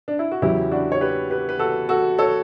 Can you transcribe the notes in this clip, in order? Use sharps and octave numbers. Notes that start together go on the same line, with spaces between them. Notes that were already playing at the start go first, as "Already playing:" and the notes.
D4
E4
F#4
E2 C#3 F#3 E4 G4
D4 F#4
C#5
G4 B4
G4 B4
B4
F#4 A4
F#4 A4
A4 C#5